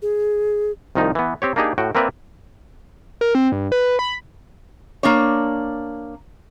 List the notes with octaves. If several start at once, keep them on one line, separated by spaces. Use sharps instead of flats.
G#4
C2 D#3 F3 D#4
E3 B3
C4 G4 C#5
A#3 D4 D#4 G4 G#4
A2 F#4 G5
A#3 C4 A#4 B4 D5 E5
A#4
C4
G2
B4
B5
A#3 D4 C#5